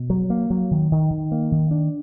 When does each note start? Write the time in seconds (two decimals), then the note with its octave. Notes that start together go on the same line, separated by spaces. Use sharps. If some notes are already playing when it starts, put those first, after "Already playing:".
Already playing: B2
0.10 F#3
0.30 A#3
0.50 F#3
0.71 D#3
0.92 D#3
1.11 D#3
1.32 A#3
1.52 D#3
1.71 D4